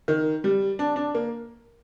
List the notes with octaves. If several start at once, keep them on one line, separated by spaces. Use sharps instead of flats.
D#3
G3
D4
D4
A#3